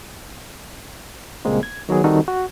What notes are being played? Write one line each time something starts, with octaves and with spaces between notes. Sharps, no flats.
C#2 A#2 G3 G#3 A#3 C4
G#6
D#3 F#3 B3 G#4
D#3 G3 C4 D#4 F#4 A4
F#4